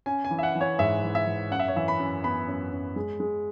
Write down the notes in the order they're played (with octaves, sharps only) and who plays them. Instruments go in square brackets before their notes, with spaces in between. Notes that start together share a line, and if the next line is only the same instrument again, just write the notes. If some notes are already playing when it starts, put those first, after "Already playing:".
[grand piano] C#4 G#5
G#5
E3
E5
F#5
E3
C#5
G#2 E5
E3
E5
E3
F#2 F#5
E5
C#5
E3 E5
B5
F#2
B3 B5
F#2
F#2
G#3
G#3